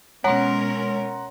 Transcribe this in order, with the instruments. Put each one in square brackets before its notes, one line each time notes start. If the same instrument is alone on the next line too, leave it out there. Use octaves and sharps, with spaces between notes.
[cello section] B2 C#4 A#4 [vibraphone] G#3 [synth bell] C#5 C6 [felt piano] F#5 A#5